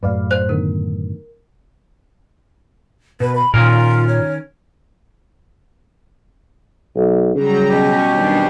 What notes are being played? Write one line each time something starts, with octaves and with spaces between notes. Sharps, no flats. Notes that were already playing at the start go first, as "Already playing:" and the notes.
F#2 A2 B4 D5 F5
C5 F#6
D3 D#3 B3 A#4
B2 B4
B5
A#2 D#3 C#4 F4 A#4
C#5
B1
C#3 F#3 G3 A#5
B2 C#4 G4
D#2 G3 B3 D4